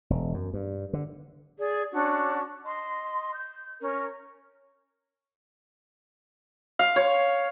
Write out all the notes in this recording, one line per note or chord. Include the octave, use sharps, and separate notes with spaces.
E1
F#2
G2
D3
G#4 D5
C#4 D4 F#4
D#5 C6
G6
C#4 A#4
F5
C#5